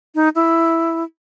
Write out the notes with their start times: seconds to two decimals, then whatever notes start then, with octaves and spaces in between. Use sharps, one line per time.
0.15 D#4
0.35 E4